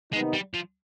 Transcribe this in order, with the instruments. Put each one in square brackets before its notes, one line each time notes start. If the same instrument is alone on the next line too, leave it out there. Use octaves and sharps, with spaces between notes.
[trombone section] C3 D#3 B3 D#4 [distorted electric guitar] G#3
[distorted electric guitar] G3
F3